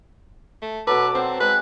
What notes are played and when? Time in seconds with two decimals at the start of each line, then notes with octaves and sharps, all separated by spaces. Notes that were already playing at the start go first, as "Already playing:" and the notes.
0.62 A3
0.87 B2 F#3 A4 B4 D6
1.15 C4 C5 F#5
1.40 G#3 C4 B4 F#6